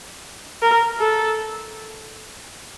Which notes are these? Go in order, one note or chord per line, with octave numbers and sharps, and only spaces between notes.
A#4
A4